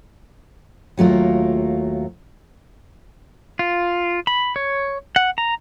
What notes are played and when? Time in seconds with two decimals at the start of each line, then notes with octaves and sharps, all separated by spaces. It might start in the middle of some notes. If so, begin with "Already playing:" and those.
0.97 D#2 F#3 A3 F4 A#4
3.59 F4
4.27 B5
4.56 C#5
5.16 F#5
5.38 A#5